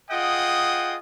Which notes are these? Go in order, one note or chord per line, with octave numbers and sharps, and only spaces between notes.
F4 G#4 D#5 F#5 G5 D#6